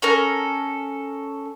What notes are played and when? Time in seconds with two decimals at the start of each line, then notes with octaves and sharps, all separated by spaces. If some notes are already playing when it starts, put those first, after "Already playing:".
0.02 C#4 A4 A#4